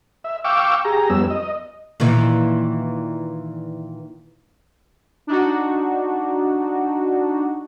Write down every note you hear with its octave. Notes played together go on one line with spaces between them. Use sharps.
E5
F5 G5 C#6 D6 E6
G4 G#4 A#5
F2 G3 B3 C#4 E6
D#5
A#2 D#3 E3
D4 D#4 F#4